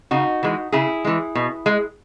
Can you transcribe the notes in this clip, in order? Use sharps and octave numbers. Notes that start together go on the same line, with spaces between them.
C#3 D#4 F#4
E3 G#3
C#3 E4 G#4
E3 G#3
B2
G#3